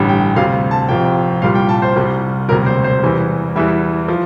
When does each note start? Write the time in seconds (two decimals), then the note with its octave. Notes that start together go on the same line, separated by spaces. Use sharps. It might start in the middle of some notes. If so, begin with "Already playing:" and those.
Already playing: A1 G2 D3 G3
0.09 G5
0.36 D2 C3 G3 F5
0.71 A5
0.89 F1 F2 C3 G5
1.42 C2 A#2 G3 F5
1.55 G5
1.69 A5
1.82 C5
1.96 C2 C3 G3
2.48 E1 D2 C3 G3 A#4
2.66 C5
2.84 C5
3.03 E2 E3 G3
3.55 E2 E3 G3 E5
4.08 F3